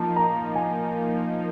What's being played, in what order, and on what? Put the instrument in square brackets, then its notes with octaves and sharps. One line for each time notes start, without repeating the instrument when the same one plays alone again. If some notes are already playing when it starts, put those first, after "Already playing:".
Already playing: [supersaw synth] F3 A#3 D#4 [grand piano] A5
[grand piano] A#5
G#5